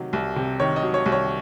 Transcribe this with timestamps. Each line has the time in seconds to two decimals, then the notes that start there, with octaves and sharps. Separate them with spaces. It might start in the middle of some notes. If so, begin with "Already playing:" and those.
Already playing: C3 D#3 F#3
0.13 C2
0.36 C3
0.60 D#3 C#5
0.76 D#5
0.83 F#3
0.94 C#5
1.06 C2
1.12 C#5